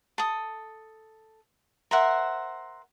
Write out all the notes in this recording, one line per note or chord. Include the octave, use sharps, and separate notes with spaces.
A4 D#6
A#4 C5 E5 F#5